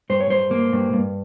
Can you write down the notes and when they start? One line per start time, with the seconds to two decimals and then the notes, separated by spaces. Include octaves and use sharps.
0.10 G2 C5
0.20 C#5
0.30 G2 C5
0.51 A#3
0.73 G2
0.93 G2